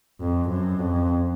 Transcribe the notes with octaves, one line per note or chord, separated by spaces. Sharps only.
F2
F#2
F2